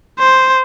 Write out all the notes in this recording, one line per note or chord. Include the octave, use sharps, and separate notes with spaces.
C5